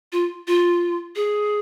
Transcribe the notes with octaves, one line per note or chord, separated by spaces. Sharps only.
F4
F4
G#4